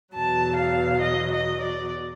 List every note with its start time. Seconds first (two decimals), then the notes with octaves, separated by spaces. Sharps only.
0.14 E2 B2 F#3 A5
0.58 F5
1.02 D#5
1.32 D#5
1.61 D5